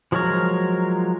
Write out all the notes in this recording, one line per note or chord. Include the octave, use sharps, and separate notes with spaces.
F3 F#3 G#3 A#4 C#5